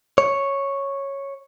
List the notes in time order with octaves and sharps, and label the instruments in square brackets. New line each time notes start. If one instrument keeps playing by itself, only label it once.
[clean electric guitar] C#5